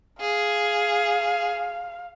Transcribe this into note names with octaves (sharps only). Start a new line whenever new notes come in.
G#4 F5